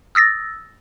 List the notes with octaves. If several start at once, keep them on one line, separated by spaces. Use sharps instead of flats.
D#6 E6 A6 A#6